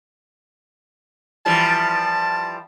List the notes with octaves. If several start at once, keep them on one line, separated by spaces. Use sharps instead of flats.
E3 F3 G3 A5